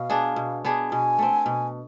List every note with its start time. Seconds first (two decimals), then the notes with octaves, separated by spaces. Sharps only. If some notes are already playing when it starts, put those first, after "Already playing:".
Already playing: B2 F5
0.10 B3 D4 G#4
0.36 B2
0.65 B3 D4 G#4
0.91 B2 G#5
1.19 A3 C4
1.46 B2